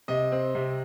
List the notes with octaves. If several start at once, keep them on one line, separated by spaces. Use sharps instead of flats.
C3 D#5
C4
C3